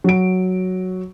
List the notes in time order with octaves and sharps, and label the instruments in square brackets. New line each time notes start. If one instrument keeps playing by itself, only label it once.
[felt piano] F#3 D7